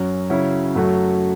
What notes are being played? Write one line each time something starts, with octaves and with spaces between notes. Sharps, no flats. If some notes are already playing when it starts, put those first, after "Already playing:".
Already playing: F#2 F#3 C#4 F#4
C#3 F#3 C#4 E4
F#2 F#3 A3 F#4